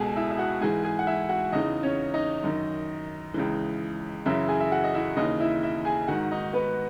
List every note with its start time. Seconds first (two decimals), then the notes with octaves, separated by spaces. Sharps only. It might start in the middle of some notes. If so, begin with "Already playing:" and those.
Already playing: C#2 B2 G#4 A4 G#5 A5
0.16 E4 E5
0.31 E5
0.38 F#4 F#5
0.61 G#2 E3 G#4 G#5
0.84 G#4 G#5
0.99 F#5
1.07 E4 E5
1.29 F#4 F#5
1.52 E2 C#3 E3 D#4 D#5
1.83 C#4 C#5
2.14 D#4 D#5
2.44 F#2 D#3
3.34 C#2 C#3 E3
4.26 F#2 C#3 E3 E4 E5
4.48 G#4 G#5
4.60 E5
4.72 F#4 F#5
4.84 D#5
4.94 E4 E5
5.17 D#2 C#3 E3 D#4 D#5
5.40 E4 E5
5.63 E4 E5
5.85 G#4 G#5
6.08 G#2 D#3 F#4 F#5
6.32 D#4 D#5
6.53 B3 B4